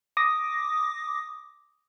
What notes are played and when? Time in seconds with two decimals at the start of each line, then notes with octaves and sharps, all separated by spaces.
0.17 D6 D#6 A#6